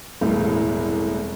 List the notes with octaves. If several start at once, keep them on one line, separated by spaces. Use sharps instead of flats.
E1 C2 A2